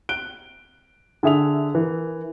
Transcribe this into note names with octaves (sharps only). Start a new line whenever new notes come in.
F#6 D7 G7
D3 G#4 E5 D#6 F7
E3 A#4